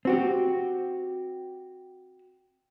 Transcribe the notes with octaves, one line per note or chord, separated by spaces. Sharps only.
C4 F#4 G4